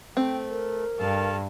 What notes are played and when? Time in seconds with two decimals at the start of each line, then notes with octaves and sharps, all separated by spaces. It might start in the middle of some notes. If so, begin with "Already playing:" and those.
0.17 A3 C4 G5
0.50 A#4
0.99 G2 A4 F5 A5